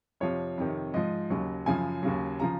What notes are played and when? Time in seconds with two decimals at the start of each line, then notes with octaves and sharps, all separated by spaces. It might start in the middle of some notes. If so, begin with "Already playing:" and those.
0.20 F2 C3 F3 C#5
0.58 F2 C3 D#3
0.94 G#2 F3 D#5
1.30 D#2 C#3 F#3
1.66 F#2 C#3 F3 G#5
2.03 D#2 C#3 F#3
2.40 C#3 F3 A#5